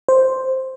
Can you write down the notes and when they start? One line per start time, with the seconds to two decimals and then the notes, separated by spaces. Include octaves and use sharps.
0.08 C5